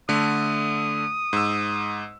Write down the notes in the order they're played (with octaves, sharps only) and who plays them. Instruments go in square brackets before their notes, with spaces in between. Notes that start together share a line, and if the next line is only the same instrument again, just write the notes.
[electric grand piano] D3 A3 [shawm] D#6
[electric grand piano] G#2 E6